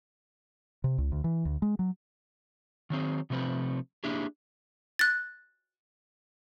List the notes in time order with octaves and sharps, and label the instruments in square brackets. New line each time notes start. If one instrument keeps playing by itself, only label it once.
[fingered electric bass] C3
C#2
D2
E3
D2
G#3
F#3
[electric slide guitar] D#3 F#3 C4 G#4
C3 F3 A3 C4 B4
A#3 D4 E4 G4 G#4
[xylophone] F#6 A6